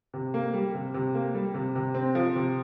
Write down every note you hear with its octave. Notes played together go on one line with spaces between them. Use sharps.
C3
A#3
G3
C3
C3
A#3
G3
C3
C3
C4
F3
C3